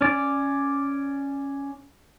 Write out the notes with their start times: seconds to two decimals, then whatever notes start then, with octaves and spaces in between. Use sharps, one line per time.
0.01 C#4 D5